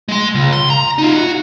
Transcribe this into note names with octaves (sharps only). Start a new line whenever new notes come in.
G#3 C6
C#2
C6
A#5
D#4 F4
F#4